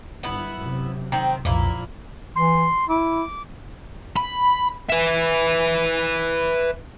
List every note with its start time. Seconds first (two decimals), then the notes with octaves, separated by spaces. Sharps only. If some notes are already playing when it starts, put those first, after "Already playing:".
0.23 G1 B3 E4
0.56 F#2 C3
1.12 D#3 C4
1.45 B1 F2 A#2 F3 A#3 E4
2.35 E3 C6
2.89 E4 D6
4.16 B5
4.90 B4 E5